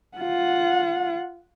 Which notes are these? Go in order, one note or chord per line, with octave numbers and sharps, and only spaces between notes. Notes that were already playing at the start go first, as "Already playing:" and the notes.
F4 F#5